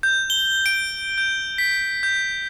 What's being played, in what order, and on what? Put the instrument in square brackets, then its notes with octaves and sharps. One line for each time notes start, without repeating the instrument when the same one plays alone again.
[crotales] G6
G7
D7
G6
B6
G6